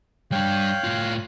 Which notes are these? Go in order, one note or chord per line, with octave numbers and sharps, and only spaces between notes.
G3 D4 C#5 F5 G5 F#6
A2 F4